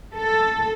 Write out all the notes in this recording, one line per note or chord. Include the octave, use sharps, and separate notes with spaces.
A4